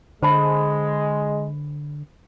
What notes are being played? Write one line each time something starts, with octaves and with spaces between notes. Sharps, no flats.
D3 G#3 C5 A5 B5